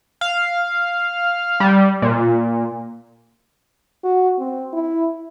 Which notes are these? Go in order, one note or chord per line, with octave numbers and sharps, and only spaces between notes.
F5
G3
A#2
F#4
C4
E4